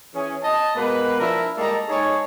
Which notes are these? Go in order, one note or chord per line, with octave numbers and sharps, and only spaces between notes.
E3 C#4 G#4
D#5 A5
B2 G#3 A#3 B4
F3 D4 E4 A#4 E5
G3 G#3 A#3 A4 D#5 A#5
G#3 D#4 G#4 A4 C#5